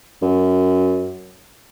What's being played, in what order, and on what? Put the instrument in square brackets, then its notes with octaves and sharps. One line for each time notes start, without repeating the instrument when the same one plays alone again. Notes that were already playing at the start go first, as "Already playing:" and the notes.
[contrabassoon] F#2